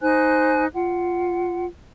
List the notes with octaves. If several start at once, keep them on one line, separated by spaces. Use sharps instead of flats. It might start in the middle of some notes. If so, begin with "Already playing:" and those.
D#4 C5 G#5 F#6
F4 F#5